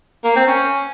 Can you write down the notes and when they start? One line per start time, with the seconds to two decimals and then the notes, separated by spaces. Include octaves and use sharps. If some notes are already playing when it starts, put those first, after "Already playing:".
0.24 A#3
0.36 C4
0.47 C#4